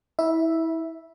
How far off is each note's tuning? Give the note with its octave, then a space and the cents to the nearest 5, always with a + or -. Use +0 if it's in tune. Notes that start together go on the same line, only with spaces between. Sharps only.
E4 -25 E5 +0